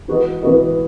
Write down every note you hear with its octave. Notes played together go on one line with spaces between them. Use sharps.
E3 B3 F#4 B4 D#5
E3 B3 F#4 B4 D#5